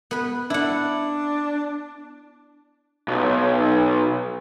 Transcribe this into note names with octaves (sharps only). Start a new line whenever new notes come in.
B3 B4
D4 E4 F#5
B1